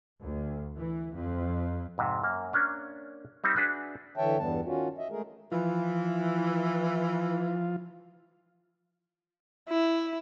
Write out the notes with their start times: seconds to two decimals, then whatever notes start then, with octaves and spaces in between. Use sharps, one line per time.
0.21 D2
0.77 E3
1.16 F2
1.98 F2 G#2 C3
2.23 F#2 A#3
2.53 A#3 C#4 D4
3.44 G3 C4 D#4 E5
3.56 D4 F#4 G#4 B4 E5
4.17 D3 E3 C#5 E5 G5 A5
4.38 E2 G2 E3 G3 B3 A5
4.65 D#3 C#4 F4 F#4
4.98 D#5 E5
5.10 G#3 A3 G#4 A#4
5.52 E3 F3 F4
9.69 E4